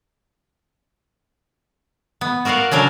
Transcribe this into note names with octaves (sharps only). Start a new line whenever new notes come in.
B3
F#4 A#4 D5 F5 F#5
C#3 F#3 D4 A#4 D5